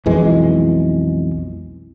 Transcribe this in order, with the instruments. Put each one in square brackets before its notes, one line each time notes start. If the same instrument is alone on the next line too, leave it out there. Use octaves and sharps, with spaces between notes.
[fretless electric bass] B1 F2 E3 G#3